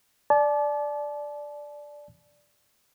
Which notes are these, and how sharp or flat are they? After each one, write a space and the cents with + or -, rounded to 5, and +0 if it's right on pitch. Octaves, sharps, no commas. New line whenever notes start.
D5 +0 A5 -35